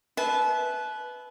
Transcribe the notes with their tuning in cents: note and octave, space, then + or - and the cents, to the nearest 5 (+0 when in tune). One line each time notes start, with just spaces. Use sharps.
B4 +0 E5 -15 A5 -35